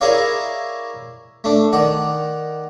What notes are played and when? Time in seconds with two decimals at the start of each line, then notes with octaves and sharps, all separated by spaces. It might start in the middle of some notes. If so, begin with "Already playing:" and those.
0.01 E4 G#4 A#4 C#5 D5 F5
1.44 A3 D4
1.73 D#3 D5 F#5